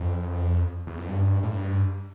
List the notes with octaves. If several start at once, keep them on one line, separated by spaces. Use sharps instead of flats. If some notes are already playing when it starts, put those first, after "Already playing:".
Already playing: F2
E2
F2
G2
A2
G2